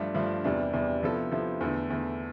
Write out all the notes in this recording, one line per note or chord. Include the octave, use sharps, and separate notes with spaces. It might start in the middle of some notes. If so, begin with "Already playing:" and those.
Already playing: G2 F3 A3 D4
G2 F3 A3 D4
E2 C3 G3 D4
E2 C3 G3 D4
C3 F3 B3 E4 A4
C3 F3 B3 E4 A4
E2 D3 A3
E2 D3 A3